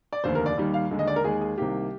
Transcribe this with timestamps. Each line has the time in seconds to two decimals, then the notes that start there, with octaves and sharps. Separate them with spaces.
0.13 D5
0.24 F1 D#2 D3 C5
0.35 A#4
0.46 D5
0.58 D#2 D#3 G3
0.74 F5
0.91 D#2 D3 G#3
0.99 D#5
1.08 D5
1.16 A#4
1.24 D#2 D#3 G#3 G#4
1.41 G#4
1.58 C2 C3 D#3 A#3 G4